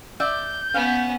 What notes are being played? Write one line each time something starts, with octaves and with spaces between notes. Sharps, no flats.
D5 E5 G6
B3 C#4 F5